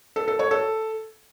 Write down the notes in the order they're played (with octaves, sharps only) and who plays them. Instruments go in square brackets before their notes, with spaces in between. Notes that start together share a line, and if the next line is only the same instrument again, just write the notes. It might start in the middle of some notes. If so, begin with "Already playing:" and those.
[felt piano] A4
A4
C#5
A4